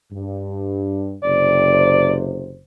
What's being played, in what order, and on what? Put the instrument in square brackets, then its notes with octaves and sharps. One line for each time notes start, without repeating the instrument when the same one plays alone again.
[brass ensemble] G2
[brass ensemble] F#1 C3 C5 [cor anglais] D5